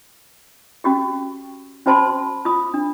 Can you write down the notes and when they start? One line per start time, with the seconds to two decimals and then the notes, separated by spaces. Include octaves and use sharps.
0.84 C#4 F#4 G4
1.86 C#4 F#4 C5 A5 B5 C6
2.45 F4 B5 D#6
2.74 D4